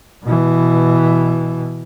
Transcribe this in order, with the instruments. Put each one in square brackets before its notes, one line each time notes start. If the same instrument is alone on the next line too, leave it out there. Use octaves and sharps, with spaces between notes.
[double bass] B2 E3